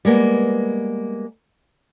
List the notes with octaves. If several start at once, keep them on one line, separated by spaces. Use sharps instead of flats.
G3 G#3 A#3 B3